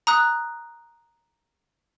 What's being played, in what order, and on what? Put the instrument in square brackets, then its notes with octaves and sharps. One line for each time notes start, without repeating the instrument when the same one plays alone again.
[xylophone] A#5 D#6 F#6